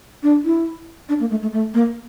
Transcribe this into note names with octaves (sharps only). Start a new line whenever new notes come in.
D4
E4
D4
A#3
A3
A3
A3
A#3